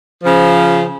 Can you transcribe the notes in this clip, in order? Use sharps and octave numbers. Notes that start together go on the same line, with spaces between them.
C#3 F3